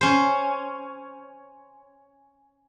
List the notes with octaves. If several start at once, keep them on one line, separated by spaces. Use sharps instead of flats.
C#4 C5